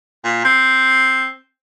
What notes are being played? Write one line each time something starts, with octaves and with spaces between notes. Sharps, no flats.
A#2
C4